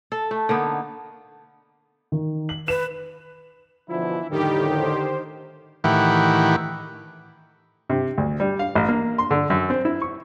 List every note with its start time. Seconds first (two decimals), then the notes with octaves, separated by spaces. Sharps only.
0.12 A4
0.31 A3
0.49 D3 A#3 B3 D#4
2.12 D#3
2.49 F#7
2.68 B4 E7
3.89 B2 D3 E3 F3 E4
4.31 F2 A2 D3 D#3 G3 G4
4.81 C5
5.84 A2 D#3 E3 E4 G4 F#5
7.90 C3
8.18 D2
8.40 G3
8.59 F5
8.75 A1
8.88 A#3
9.18 C6
9.31 D3
9.50 F#2
9.70 C4
9.85 E4
10.02 C#6